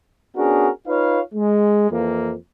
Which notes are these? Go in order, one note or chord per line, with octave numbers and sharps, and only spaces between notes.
B3 C#4 D4 F#4 G#4 A#4
D#4 F4 B4 C#5 F5
G#3
F2 E3 A#3